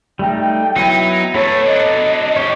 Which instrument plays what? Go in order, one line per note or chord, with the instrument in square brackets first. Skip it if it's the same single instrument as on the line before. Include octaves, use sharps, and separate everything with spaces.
[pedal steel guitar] G3 A3 D#4 [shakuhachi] G5
[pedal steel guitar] F#3 B3 E4 [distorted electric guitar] D#4
[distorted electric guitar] D2 A3 [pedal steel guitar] B3 A4 A5 [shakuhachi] C#5
[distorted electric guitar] D3 F#3 [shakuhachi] D#5
[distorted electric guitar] E3 G4 [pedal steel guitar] C#5 C#6